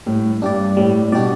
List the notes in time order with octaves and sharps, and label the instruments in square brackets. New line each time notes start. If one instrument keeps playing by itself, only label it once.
[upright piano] A2 [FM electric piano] G3
[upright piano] G2 [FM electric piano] D4 G4 D5
[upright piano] A2 [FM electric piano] G3
[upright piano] A2
[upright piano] B2 [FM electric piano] D4 G4 D5